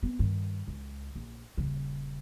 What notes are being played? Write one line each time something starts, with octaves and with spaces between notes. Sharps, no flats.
B3 C4
G2 D#3
C#2
A#1
D#1 C#3